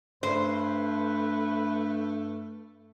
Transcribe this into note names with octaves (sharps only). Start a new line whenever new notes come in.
G2 A3 B4 C5